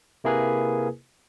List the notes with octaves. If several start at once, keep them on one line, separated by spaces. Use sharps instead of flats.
C3 A#3 E4 G#4 A#4 B4